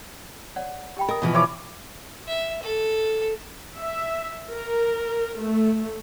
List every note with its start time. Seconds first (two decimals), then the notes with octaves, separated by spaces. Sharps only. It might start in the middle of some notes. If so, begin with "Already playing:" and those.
0.56 C#5 D5 F#5
0.97 G4 G5 B5
1.09 A#4 D#5 D#6
1.22 B2 E3 F3
1.33 E4 C#5 D6
2.27 E5
2.62 A4
3.76 E5
4.50 A#4
5.40 A3